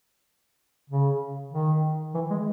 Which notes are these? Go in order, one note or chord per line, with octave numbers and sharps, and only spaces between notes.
C#3
D#3
E3
G#3